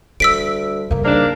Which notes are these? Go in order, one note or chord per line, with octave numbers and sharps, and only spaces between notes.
D2 G3 E6 B6 D7
C#3 G3 A#3
G#2 A#3 D4